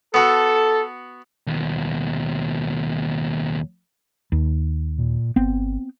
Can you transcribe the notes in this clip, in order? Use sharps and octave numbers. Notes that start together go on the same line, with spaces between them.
B3 F#4 A4
D#2 B2
D#2
A#2
G1 B3 C4